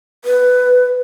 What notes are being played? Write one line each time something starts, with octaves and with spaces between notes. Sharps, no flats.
B4